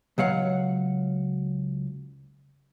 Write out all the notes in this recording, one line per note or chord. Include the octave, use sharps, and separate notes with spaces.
C#2 F#3 F5 F#5